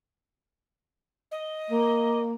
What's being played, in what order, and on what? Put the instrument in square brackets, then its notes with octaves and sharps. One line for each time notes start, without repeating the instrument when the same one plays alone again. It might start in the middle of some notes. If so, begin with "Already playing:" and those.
[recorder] D#5
[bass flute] A#3